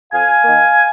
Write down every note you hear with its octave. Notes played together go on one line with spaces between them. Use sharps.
F2 F5 G#5
D#3 A#3